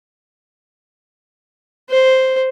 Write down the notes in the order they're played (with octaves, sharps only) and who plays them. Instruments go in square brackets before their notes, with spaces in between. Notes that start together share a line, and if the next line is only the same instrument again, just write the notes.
[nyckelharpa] C5